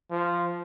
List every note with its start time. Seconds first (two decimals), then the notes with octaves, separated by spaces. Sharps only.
0.11 F3